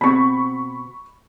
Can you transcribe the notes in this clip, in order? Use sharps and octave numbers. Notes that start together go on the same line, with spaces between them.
B2 C4 B5 C#6